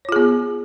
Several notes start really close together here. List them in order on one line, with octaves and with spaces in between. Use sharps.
C#5 F4 G#4 B3